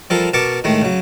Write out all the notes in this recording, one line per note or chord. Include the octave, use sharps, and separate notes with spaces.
F3 G3 A4 A#4
B2 A#4 A5 C#6 D6
A2 D#3 G#3 A3
C#3 F#3